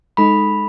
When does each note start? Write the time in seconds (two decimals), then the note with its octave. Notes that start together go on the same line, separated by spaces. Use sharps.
0.17 G#3 D#4 A4 B5